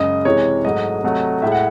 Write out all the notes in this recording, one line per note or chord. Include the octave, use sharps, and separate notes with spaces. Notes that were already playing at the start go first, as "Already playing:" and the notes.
Already playing: F#2 C#3 G#3 D#5
C3 E3 G#3 C#5
G#2 F#3 A3 D#5
C3 F#3 A3
A2 G#3 E5
F#5